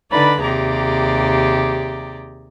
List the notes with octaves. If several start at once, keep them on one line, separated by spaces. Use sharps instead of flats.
D3 D#4 B4 D5 B5 A6
D#2 C3 G4 G#4 D5 A#5